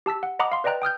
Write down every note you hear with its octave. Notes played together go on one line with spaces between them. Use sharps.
G4 A5 E6 B6
F#5
D#5 F#5 A#5 B5 D6 D#6
F5 C6
B4 D5 D#5 G5 A#5 F#6
G5 D#6 F6 G6